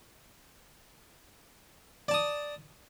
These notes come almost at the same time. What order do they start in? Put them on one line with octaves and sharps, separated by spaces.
D5 A5 D#6